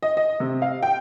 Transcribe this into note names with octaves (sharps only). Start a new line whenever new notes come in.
D#5
D#5
C3
F5
G5